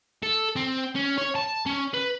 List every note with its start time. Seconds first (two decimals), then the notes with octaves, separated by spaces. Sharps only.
0.23 A4
0.56 C4
0.95 C#4
1.18 C#5
1.35 A5
1.66 C#4
1.94 B4